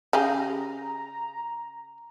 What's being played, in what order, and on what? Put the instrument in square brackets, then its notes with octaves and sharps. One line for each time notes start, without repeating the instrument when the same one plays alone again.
[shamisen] C#3 G4 G#4 [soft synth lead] A#5